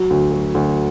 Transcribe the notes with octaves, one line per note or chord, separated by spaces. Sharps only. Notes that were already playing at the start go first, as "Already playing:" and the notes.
Already playing: F#3
D2
F#3
D2